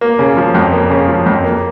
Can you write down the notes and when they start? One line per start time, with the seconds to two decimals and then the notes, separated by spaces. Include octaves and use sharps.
0.01 A#3
0.19 C#3
0.37 F3
0.54 F2
0.72 A#3
0.90 C#3
1.08 F3
1.26 F2
1.44 A#3